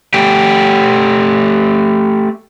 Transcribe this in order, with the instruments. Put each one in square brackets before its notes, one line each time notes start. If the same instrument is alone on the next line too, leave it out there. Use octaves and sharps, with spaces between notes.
[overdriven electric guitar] A3 G4